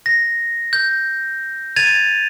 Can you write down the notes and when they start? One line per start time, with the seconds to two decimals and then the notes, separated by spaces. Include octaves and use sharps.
0.06 A#6
0.73 G6
1.76 G#6 A6 D#7 F7